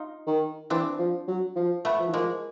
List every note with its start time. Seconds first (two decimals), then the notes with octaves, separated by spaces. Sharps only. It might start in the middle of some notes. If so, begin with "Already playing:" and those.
Already playing: D#4 F4
0.27 D#3
0.70 E3 C4 D4
0.99 F3
1.28 F#3
1.56 F3
1.85 A3 B3
1.99 F3
2.08 E3
2.14 F3 G#3 A#3